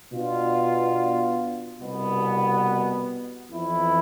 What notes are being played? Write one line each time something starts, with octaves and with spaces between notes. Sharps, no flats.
B2 B3 D4 F4
C2 B2 B3
F2 E3 B3 E4